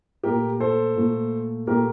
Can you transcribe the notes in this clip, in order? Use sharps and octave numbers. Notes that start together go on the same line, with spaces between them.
A#2 A3 G4 A#4
A4 C5
A#2 A3
A#2 A3 G4 A#4